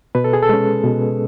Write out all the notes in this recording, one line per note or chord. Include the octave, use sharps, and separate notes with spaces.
B2 B4
A4
G#4
A4
G#3 C#4
B2